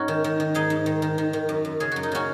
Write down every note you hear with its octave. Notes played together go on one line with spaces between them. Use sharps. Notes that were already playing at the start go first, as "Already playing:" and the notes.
Already playing: G#2 C#4 D#4 F#4
D#3
D#3
D#3
G#2 D#4 G#4
G#2
D#3
D#3
D#3
D#3
F#2
F#2
C#3 G#4
F#2 F#4
D#4
C#3 C#4 F#4